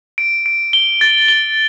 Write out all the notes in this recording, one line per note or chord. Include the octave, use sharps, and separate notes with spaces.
D7
D7
G7
A6
G7